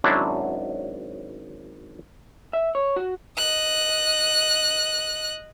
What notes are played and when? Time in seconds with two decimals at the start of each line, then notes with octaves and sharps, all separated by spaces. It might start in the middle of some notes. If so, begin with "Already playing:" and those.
0.04 G#1 F#3 C#4 D4 E4 C5
2.53 E5
2.75 C#5
2.96 F#4
3.37 D#5 F#6